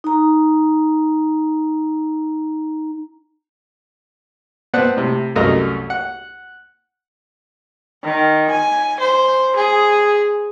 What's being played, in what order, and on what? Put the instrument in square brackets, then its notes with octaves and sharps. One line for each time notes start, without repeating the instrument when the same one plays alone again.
[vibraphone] D#4 A#5
[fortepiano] B3 C4 D5 F#5 A5
A2 C3
C2 F#2 A3 A#4 D#5
F#5
[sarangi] D#3
G#5
C5
G#4